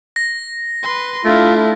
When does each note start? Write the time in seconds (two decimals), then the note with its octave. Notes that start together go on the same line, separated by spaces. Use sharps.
0.16 A#6
0.83 B4 C6
1.25 A3 D4 E4 F4